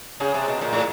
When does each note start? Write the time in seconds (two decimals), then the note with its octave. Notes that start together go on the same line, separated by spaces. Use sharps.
0.20 C#3 G#4
0.34 C3
0.48 B2
0.61 A#2
0.73 A2